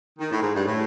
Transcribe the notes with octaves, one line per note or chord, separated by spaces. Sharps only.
D#3
A2
G#2
G2
A2